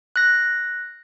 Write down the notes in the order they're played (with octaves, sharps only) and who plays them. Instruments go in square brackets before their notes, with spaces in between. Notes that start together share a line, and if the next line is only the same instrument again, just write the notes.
[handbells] F#6 A#6